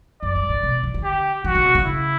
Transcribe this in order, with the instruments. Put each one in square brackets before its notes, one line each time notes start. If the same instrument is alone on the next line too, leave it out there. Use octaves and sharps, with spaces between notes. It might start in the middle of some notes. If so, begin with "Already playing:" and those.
[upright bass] F#2 [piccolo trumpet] D5
[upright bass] G2
A2
B2
E3
D3
[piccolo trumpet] G4
[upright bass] E3 [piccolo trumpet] F#4
[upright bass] D3
C#3
B2
C#3
[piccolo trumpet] E4